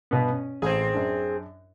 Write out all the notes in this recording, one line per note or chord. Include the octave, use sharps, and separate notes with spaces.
G2 B2 B3
C#4
A1 C4 G#4
F#2 C#4 D4